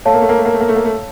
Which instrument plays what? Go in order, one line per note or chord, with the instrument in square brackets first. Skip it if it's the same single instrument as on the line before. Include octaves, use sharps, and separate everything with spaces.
[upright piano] A3 [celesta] C#5 F5 A5
[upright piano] A#3
A3
A#3
A3
A#3
A3
A#3
A3
A#3
A3